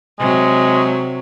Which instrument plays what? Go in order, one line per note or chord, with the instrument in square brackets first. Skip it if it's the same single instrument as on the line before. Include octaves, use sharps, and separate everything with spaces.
[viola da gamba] C3 F#3 [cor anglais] G#3